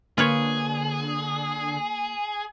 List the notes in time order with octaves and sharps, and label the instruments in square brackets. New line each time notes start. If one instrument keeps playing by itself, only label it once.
[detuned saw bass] D3 [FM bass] A#3 [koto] F4 B4 C#5 [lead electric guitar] G#4